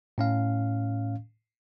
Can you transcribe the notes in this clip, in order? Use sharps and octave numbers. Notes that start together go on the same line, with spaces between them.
A2 C#4 F5